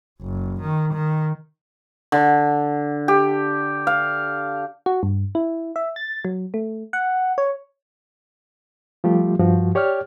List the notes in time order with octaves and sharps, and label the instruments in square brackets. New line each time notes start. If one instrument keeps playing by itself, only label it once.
[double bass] F#1
D#3
D#3
[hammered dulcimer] D3
G4
F5
[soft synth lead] F#4
G2
E4
E5
A6
F#3
A3
F#5
C#5
[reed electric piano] F3 G3 A3 F4 G4
G2 F3 F#4
G4 C#5 D5 G5 F6